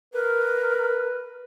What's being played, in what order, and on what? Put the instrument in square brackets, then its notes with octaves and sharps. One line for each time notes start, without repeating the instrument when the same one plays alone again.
[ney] A#4 [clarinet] B4